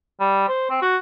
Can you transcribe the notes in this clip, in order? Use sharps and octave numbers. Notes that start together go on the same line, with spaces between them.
G3
C5
C4
F#4